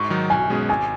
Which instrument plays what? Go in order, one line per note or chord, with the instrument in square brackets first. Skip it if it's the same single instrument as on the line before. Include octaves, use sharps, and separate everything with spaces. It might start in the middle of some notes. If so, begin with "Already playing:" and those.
Already playing: [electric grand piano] G#2 [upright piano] C#6
[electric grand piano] D#3 F#3 D#4
[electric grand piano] B1 [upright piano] G#5
[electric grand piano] B2 G#3 C#4 G#4
[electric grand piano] G#1 [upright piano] G#5